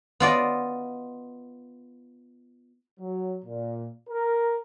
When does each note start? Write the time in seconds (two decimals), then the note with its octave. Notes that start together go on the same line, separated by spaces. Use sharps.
0.20 B3 F4 D5 D#5
3.00 F#3
3.45 A#2
4.09 A#4